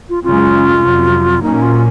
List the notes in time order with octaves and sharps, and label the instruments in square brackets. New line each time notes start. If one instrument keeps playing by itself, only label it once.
[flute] F4
[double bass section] F#2 C#3 G#3 C#4 [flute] F4
[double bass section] F2 C3 F#3
[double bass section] A#2 F#3 A#3 C#4 [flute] D#4
[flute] F4